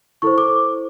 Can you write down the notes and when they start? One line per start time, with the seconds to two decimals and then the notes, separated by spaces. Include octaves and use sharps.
0.22 E4 A4 C5 C#6
0.38 D6